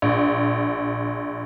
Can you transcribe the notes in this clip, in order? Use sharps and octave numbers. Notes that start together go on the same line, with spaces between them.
A#1